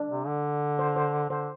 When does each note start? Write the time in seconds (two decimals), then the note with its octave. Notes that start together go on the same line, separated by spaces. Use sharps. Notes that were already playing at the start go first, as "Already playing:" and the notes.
Already playing: D4
0.10 C3
0.27 D3
0.79 C5
0.96 C5
1.30 D3 C5